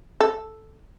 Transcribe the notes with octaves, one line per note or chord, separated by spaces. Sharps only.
A4